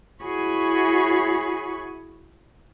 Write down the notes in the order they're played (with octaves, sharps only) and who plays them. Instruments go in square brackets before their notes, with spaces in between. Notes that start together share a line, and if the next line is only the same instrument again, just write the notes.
[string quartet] E4 F#4 G#4 C#5 B5 C#6